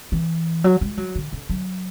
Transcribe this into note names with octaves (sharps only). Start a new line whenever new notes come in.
E3
F#3
G#3
F#3
D3
D3
F#3